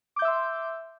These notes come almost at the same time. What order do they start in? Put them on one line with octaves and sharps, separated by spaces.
D6 G6 E5 E6 C6